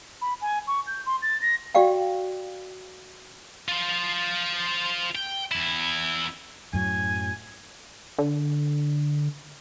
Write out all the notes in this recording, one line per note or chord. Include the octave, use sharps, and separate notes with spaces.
B5
G#5
C#6
G6
C6
A6
A#6
F#4 G4 D5 F5 G5
F4 C5
G5
E2 E4
F#2 A2 F#3 G#5
D3